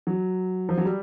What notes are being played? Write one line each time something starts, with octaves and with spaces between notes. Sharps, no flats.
F#3
F3
F#3
G3